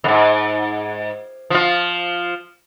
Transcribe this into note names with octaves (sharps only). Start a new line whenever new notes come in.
F2 G#2
F3 F4